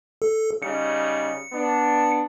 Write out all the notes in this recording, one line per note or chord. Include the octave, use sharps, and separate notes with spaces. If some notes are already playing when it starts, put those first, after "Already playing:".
A4
C#3 G3 D#4 C#7
B3 D4